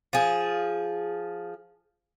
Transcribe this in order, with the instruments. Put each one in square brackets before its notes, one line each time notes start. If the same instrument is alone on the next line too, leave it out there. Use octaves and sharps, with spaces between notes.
[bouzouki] F3 G#4